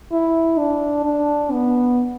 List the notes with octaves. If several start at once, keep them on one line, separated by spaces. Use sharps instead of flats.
E4
D4
D4
B3